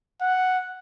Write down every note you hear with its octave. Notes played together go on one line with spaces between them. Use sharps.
F#5